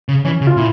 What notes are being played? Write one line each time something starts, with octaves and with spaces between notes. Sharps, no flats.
C#3
E3 C#4
C#3
F4
A#2 E4